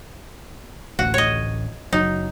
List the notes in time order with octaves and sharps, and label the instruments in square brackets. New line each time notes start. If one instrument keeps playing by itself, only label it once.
[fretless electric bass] A1 D2 [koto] F#4
[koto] C#5 D#5
[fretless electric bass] F#1 F#3 [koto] D#4